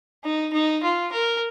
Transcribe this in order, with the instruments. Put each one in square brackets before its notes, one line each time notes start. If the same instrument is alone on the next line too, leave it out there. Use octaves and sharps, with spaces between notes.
[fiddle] D#4
D#4
F4
A#4